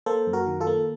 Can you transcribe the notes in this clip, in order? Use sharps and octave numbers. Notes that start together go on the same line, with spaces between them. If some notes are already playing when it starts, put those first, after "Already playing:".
A#3 A4 C5
F#2
F#4 A#4
D#3
F4 A4
A#3